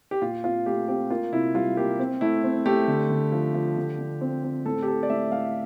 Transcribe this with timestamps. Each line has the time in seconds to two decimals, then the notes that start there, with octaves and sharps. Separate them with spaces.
0.11 G4
0.22 A#2 F4
0.44 C4 F4
0.66 A3 G4
0.88 C4 G4
1.10 A#3 F4
1.32 C3 E4
1.55 G3 F4
1.77 A#3 G4
1.99 C4
2.21 A3 E4
2.44 C4
2.66 A3 G4
2.88 D3
3.10 D3
3.32 F3
3.54 F3
3.77 D3
3.99 D3
4.21 C4
4.43 C4
4.65 A2 A4
4.82 G4
4.87 C4 A4
5.03 D5
5.10 A2 E5
5.31 A2 F5